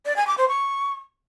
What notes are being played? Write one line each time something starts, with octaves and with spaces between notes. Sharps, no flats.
D5
G#5
D6
C5
C#6